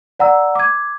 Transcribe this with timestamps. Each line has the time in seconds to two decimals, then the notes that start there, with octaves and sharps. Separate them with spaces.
0.20 D5 F#5 A#5 E6
0.55 D6 G#6